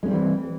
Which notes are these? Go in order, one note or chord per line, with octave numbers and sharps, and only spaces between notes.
E3 G3 G#3 C4 C#4